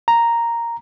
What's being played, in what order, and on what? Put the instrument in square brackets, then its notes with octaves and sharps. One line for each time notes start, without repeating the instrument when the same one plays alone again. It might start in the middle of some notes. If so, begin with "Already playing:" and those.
[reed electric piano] A#5